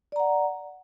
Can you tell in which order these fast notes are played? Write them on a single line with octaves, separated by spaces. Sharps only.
D5 A#5 F#5